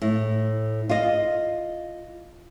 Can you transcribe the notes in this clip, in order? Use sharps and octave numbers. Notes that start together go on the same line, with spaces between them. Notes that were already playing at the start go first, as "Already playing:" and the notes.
A2
F4 D#5